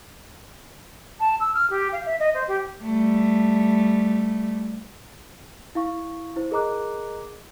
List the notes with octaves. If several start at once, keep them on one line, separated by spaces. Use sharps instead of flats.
A5
E6
F6
G4
F5
E5
D#5
C5
G4
G3 A3
E4 F5 C#6
E4 C5
G#4 A#4 D#5 A#5 D6 F#6